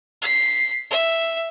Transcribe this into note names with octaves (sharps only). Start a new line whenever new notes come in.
B6 C7
E5